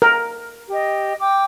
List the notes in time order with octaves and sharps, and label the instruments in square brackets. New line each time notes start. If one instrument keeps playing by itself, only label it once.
[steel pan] A#4
[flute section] G4 D#5
G5 D6